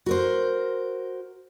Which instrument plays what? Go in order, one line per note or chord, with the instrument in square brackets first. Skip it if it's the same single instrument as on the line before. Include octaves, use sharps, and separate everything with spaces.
[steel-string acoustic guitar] F#4 A#4 C5